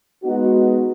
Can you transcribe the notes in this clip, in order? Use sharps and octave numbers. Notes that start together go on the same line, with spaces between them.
G#3 B3 D#4 F#4